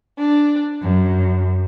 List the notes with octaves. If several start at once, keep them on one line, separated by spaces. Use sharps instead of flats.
D4
F#2